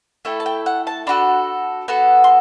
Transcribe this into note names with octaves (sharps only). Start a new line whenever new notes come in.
A3 E4 A4 G5
A5
G5
F#5
A5
D4 F#4 A4 B5
B3 F#4 A4
C6